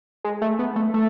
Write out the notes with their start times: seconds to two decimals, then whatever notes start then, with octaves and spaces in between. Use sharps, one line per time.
0.24 G#3
0.42 A3
0.59 B3
0.76 A3
0.94 A3